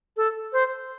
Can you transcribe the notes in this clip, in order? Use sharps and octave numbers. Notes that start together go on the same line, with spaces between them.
A4
C5